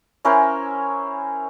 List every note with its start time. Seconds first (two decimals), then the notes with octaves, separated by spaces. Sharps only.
0.25 C#4 E4 A#4 C5